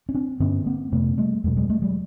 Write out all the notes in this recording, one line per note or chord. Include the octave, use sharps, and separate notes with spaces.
C#4
C4 D4
G2 D3 B3 C#4
A#3 C4
F2 C3 A3 B3
G3 A3
E2 B2 F#3 G#3
F#3 G#3
G3 A3
F#3 G#3